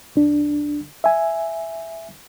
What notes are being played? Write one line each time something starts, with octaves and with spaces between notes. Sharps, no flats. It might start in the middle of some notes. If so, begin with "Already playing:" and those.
C2 D4
E5 G#5